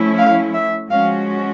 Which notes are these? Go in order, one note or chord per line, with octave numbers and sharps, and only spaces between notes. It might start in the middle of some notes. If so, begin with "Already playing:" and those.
Already playing: F3 A3 C#4 E4
F5
E5
F3 G#3 C#4 F#4 F5